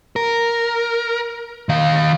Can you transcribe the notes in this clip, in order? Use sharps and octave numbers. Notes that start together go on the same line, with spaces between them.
A#4
D#3 F5